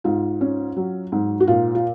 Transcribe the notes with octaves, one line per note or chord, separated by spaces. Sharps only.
G#2 F4
C#4
F#3
G#2
F#4
A#2 F4
F4